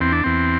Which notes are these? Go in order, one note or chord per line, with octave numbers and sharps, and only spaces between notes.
E2 C4
D4
E2 C4